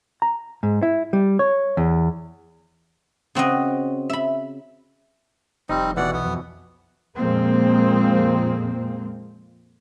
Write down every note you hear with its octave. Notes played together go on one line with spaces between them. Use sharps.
A#5
G#2
E4
G3
C#5
E2
C#3 C4 F#4 D#5
E5 B5
F1 G3 C4 D#4
B2 E3 D5 F#5
B1 B3
F2
F2 A#2 F3 G#3 A#3 C4